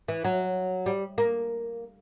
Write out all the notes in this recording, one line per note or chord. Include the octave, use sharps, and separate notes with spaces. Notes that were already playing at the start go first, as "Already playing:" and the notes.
E3
F#3
G3
A#3